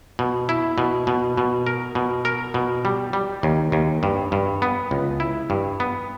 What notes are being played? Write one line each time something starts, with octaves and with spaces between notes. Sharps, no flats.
B2
E4
B2
B2
B2
A#4
B2
A#4
B2
G3
G3
D#2
D#2
G2
G2
B3
C#2
E4
G2
B3